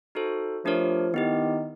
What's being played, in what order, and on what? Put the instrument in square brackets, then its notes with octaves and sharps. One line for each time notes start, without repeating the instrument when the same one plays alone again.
[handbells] D#4 F#4 A4 C5
[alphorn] F3 [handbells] A3 D4 G4 A#4 C#5
[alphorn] D#3 [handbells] B3 E4 G4